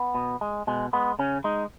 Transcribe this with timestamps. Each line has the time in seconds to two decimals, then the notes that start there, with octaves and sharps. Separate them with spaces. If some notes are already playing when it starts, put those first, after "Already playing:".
Already playing: B3
0.15 B2
0.41 G#3
0.67 B2 G#3
0.93 G#3 B3
1.19 C#3 C#4
1.44 G#3 D#4